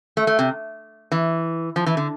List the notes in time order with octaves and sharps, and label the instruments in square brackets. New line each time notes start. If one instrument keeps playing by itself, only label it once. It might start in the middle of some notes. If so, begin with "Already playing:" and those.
[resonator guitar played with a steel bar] A3
A3
C3
E3
F3
E3
D3